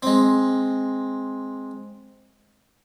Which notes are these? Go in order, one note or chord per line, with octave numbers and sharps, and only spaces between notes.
G#3 C4